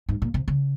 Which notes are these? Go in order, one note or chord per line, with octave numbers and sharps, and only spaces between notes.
G#2
A#2
C3
C#3